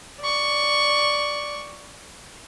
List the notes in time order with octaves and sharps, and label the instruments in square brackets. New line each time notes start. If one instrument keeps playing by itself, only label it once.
[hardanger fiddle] D5 C#6